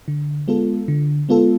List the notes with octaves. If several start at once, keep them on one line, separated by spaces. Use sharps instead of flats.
D3
G#3 B3 F4 A4
D3
G#3 B3 F4 A4